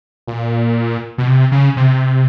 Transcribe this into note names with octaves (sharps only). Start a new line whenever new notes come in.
A#2
B2
C3
C#3
C3